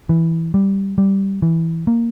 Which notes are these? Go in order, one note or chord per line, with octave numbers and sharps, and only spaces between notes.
E3
G3
G3
E3
A#3